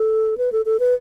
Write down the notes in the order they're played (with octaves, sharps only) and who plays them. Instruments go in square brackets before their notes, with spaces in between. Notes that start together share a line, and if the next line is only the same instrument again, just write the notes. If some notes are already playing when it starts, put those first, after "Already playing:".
Already playing: [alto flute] A4
B4
A4
A4
B4